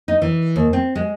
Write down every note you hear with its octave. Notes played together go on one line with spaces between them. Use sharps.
D#4
E3
D#2
C4
G#3